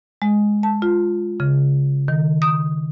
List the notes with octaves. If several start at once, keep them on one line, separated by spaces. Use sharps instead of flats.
G#3
A5
F4
C#3
D#3
D#6